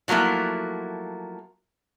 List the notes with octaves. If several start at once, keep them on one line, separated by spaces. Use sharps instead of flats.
F3 F#3 A3 A#3 E4